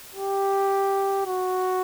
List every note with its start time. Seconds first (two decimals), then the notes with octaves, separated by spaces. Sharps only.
0.14 G4
1.26 F#4